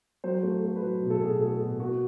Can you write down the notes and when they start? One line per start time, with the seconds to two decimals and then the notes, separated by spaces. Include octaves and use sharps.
0.24 F#3 C5
0.43 A3
0.63 A3
0.76 B4
0.82 F#3
1.02 B2
1.10 A4
1.21 B2 G#4
1.40 A3 A4
1.60 B2
1.80 A#3 F#4